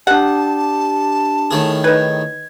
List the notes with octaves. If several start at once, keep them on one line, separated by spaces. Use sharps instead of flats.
D4 G4 F#5 A5
A2 D#3 G#4
D#4 B4 G#6